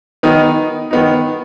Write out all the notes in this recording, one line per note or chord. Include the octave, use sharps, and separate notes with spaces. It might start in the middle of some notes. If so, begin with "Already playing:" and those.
D#3 B3 D#4
D#3 B3 D#4